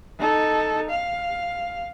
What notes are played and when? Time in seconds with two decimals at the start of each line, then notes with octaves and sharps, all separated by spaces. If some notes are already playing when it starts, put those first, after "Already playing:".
0.19 D#4 A4
0.90 F5